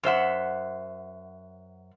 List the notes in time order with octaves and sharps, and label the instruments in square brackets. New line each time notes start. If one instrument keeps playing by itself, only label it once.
[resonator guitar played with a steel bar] F#2 C5 E5 F#5